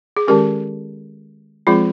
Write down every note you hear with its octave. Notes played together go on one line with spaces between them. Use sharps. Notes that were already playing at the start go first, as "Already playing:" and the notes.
G#4
D#3 G#3 C#4 G4 A#4
F3 G#3 C4 F4 G#4